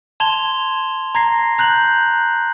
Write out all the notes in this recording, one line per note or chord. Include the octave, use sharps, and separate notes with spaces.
A5 C6 G#6 F7 G7
A#5 G#6 A#6 C7
A#5 F#6 G6 F#7